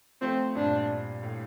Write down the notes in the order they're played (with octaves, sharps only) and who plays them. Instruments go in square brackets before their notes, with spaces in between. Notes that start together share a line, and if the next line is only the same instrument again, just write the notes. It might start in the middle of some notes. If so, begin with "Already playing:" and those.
[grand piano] F3 A3 [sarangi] C4
[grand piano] G2 A#2 [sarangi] D4
[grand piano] A2